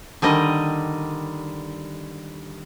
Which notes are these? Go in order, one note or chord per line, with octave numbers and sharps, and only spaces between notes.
D3 D#3 G3 D#5